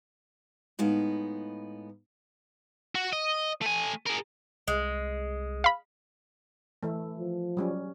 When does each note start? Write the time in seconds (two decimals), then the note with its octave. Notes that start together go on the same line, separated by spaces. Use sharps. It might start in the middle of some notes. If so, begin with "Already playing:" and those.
0.79 A2 G#3 B3 D#4 F5
2.95 F#4
3.13 D#5
3.62 A3 G#5
4.06 G#4 A#4
4.68 C2 G#3
5.64 F5 B5
6.83 E3 A3
7.19 F3
7.57 F#3 G3 C#4